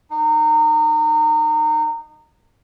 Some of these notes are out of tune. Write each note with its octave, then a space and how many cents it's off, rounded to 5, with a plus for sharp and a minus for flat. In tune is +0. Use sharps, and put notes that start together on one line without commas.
D#4 -30